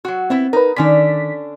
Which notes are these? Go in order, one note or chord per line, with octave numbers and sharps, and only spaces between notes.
F#3 F#4
B3 C4 E4 E5
D#4 A#4 B4
D3 D#3 C#4 D4 B6